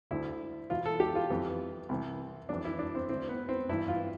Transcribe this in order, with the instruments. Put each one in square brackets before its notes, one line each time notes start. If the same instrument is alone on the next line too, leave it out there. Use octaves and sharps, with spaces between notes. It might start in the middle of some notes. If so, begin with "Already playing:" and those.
[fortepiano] D2 D3 E4
E2 B2 F4
A4
G4
F4
F2 E3
C2 C3 E3
F2 E3 D4
E4
D4
C4
D2 D3 C4
B3
C4
G2 E3 E4
F4